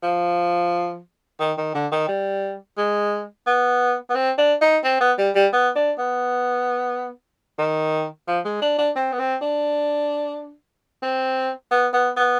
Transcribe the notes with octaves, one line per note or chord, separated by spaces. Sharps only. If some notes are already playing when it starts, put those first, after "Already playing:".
F3
D#3
D#3
D3
D#3
G3
G#3
B3
B3
C4
D4
D#4
C4
B3
G3
G3
B3
D4
B3
D#3
F3
G#3
D4
D4
C4
B3
C4
D4
C4
B3
B3
B3